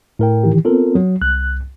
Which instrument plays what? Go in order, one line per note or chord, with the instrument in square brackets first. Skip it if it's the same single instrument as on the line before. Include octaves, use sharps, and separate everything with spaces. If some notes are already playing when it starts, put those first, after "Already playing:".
[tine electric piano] A2 A#4 G5
[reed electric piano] D#3 E3 G4
[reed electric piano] B3 C4 [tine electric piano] F4 A4 A#4
[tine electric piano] F#3
[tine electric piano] C2 [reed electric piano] F#6